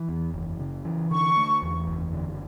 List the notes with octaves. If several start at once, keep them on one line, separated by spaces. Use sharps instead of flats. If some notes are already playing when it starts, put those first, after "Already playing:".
Already playing: E3
E2
F#1
C#3
E3
D3 C#6
A3
E2
F#1
D3